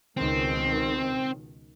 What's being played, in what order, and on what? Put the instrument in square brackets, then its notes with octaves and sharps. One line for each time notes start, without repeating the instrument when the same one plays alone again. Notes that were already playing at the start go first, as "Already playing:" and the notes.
[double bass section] C#2 B2 D#3 [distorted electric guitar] C4